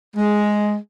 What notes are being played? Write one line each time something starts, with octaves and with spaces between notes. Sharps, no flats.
G#3